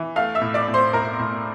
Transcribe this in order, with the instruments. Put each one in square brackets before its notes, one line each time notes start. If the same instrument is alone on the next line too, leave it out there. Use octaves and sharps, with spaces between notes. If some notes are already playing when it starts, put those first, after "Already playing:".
Already playing: [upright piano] E3
A3 F5 F6
E5 E6
A2
D5 D6
A2
C5 C6
A2 A#4 A#5
A2